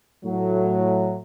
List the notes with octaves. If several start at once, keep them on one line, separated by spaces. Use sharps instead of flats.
A2 F#3